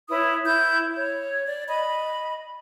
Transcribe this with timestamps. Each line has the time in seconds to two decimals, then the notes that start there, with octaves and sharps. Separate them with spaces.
0.09 E4 B4 C#5 D#6
0.44 E4 G6
0.95 C#5
1.46 D5
1.69 D#5 B5